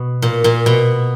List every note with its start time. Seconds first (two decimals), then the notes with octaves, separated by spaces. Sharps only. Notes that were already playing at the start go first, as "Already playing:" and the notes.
Already playing: B2
0.22 A#2
0.44 A#2
0.66 B2